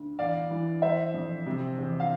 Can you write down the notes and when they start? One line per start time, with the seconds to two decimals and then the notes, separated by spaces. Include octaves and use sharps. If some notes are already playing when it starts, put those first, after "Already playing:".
Already playing: D2
0.19 E2 D5 F5
0.50 E3
0.82 E3 C5 E5
1.14 F2
1.46 C3
1.78 E2
2.00 F5